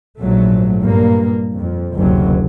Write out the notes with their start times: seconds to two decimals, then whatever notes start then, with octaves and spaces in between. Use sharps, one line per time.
0.21 A#1 G#2 F#3 A3
0.83 G2 A#2 A#3
1.57 F2
1.97 F#1 D2 C3 F#3